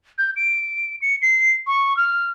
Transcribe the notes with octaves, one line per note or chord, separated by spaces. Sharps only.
G6
D7
C#7
C7
C#6
F6